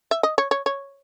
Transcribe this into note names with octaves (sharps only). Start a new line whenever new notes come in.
E5
D#5
C#5
C#5
C#5